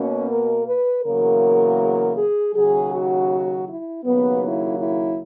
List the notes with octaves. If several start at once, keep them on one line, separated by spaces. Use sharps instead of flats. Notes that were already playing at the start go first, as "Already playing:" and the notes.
Already playing: B2 A#3 C#4
A#4
B4
E2 C#3 F#3 A#3 A#4
G#4
D#2 C#3 F#3 G#4
F#4
E4
D#2 C#3 F#3 A#3 B3
E4
E4